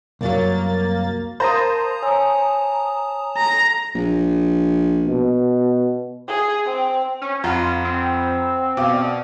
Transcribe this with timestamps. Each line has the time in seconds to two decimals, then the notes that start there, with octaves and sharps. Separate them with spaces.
0.21 C2 F#2 F#3 A#3 A6
1.40 A#4 C5 F5 A5 A#5 D#6
2.02 C#5 G#5 E6
3.37 A#5
3.95 A#1
5.06 B2
6.28 G#4
6.66 C4
7.21 C#4
7.44 F2 F4 F#5 A#5 B5
7.85 C4
8.77 B2 F5 D6
8.93 D5